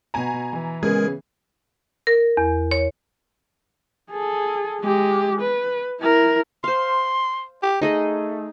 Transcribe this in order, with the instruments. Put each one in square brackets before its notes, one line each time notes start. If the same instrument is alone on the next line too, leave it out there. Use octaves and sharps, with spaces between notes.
[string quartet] B2 [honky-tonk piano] G#5 A#5
[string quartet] E3
[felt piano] C#3 B3 C#4 [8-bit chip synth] G#3 A#4 [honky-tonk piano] G#4
[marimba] A#4
E2
C#5
[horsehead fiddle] G#4 A4
G#3 G4
B4
E4 A#4
[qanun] C5 F5 [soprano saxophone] C6
[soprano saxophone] G4
[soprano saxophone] A3 [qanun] D#4 G#4 D#5